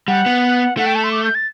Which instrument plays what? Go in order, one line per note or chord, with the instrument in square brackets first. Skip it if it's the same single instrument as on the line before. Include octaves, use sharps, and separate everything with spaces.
[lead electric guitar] G3 [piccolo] F#5
[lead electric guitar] B3
[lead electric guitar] A3 [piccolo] F#5
[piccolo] G5
A5
C6
D6
G6
A6